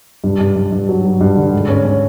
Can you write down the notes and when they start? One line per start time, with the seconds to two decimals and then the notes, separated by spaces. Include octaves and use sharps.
0.24 G2
0.41 G2
0.56 G2
0.72 G2
0.89 F#3
1.05 F#3
1.21 G2
1.37 D3
1.53 G#2
1.69 C#4
1.85 C#4